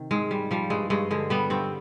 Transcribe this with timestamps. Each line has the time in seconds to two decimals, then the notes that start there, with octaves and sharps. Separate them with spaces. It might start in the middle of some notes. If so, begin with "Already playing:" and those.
Already playing: C3 D#3
0.11 G#2 G#3
0.31 G3
0.51 F3 G3
0.70 G2 G#3
0.90 G2 G#3
1.11 D3 G#3
1.30 G3 B3
1.50 G2 C4